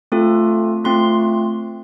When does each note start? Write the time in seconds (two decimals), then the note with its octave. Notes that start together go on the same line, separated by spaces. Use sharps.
0.12 A3 C4 F4 A4
0.84 A3 C4 F4 C6